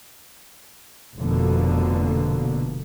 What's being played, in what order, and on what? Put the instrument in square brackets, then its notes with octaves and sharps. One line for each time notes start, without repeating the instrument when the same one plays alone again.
[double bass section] F1 B2 D3 A#3